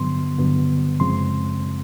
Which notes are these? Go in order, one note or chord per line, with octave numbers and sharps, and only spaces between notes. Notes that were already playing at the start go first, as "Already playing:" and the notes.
Already playing: G2 D3 F#3 B3 C6
G2 D3 F#3 B3
F#2 C#3 F3 G#3 C4 C6